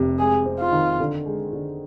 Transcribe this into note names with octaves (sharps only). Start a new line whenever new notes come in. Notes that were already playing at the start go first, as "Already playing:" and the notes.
Already playing: F1 C3
G#3 G#4
C4
F4
D#3
D3
G#3
D3